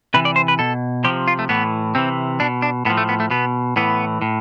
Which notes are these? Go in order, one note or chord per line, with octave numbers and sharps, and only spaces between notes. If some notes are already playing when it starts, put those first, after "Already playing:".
C3 E3 B4
D5
C5
B4
B2 A4
C3 F3 G4
F4
A3
A2 E3 B3
C3 E3 C4
B2 D4
D4
A2 F3 B3
A3
B3
A3
B2 B3
A2 E3 B3
A2